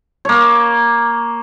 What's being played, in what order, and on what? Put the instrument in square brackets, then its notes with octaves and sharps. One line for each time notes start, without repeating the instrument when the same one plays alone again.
[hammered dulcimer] A#3 C#5